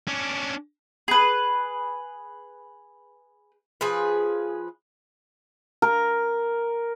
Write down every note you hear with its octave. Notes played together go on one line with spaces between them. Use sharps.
C#4 D4
G#4 B4
F3 G#4 B4
A#4